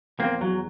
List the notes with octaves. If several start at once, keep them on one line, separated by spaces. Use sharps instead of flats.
E2 A#3 C4
E2 F#3